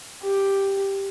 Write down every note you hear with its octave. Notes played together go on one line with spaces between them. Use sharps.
G4